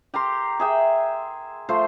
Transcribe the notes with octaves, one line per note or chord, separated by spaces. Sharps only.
G4 A#4 A#5 C6
G#4 E5 G5
F3 A3 C5 C6